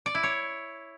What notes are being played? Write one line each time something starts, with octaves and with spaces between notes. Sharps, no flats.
D5
E4
C#5